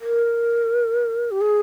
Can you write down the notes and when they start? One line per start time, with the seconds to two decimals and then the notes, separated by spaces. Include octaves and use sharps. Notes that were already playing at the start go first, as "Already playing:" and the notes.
0.01 A#4
1.31 G4
1.41 G#4